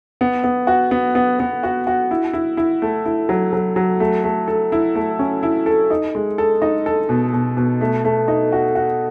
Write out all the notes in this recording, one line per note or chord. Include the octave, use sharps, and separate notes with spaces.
B3
B3
F#4
B3
B3
B3
F#4
F#4
E4
E4
E4
A3
E4
F#3
F#3
F#3
A3
A3
A4
E4
A3
C#4
E4
A4
D#4
G#3
A4
D#4
A4
B2
B2
B2
A3
A3
D#4
F#4
F#4